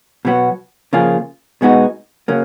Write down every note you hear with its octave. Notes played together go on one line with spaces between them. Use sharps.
B2 F#3 B3 F#4
C#3 F3 A#3 F4 G#4
B2 G#3 B3 D#4 F#4
C#3 F#3 A#3 C#4